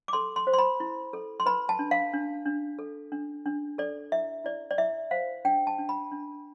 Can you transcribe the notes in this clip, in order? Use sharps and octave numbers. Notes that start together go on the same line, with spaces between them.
D6
A4 C6
C6
C5
C6
B5
E4
A4
C6
B4 B5
A5
D4
F5
D4
D4
A4
D4
D4
A4 D5
E4 E5
E4 D5
D5
E4 E5
C5 F5
D4 G5
A5
D4
B5
D4